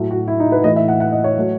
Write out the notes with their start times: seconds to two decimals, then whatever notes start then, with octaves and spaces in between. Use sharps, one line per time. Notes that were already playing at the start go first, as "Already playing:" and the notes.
Already playing: A2 F#3 A3
0.11 F#4
0.28 E4
0.40 D#4
0.52 B4
0.64 A2 E3 A3 D#5
0.76 E5
0.88 F#5
1.00 F#5
1.12 D#5
1.24 C#5
1.37 F#3 A3